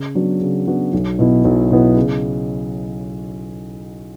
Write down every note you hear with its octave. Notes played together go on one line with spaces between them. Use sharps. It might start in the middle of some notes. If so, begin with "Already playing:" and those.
Already playing: C#3
F#3 B3 D4 F#4
C#3
F#3 B3 D4 F#4
B1
B2 F#3 B3 E4
B1
B2 F#3 B3 E4
C#3